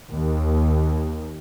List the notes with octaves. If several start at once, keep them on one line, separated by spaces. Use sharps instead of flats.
D#2